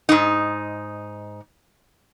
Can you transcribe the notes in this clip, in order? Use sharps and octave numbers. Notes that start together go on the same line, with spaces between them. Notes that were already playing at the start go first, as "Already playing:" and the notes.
G#2 D#4